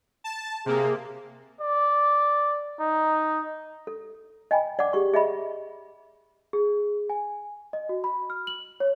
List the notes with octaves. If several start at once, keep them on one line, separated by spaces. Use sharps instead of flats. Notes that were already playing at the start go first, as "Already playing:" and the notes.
A5
C3 A#3 G#4
D5
D#4
A4
D#5 G5 G#5 B5
D5 F#5 D6
G4 G#4 C#6
G#4 D#5 E5 B5
G#4
G#5
D#5
F#4
B5
F6
F#7
C#5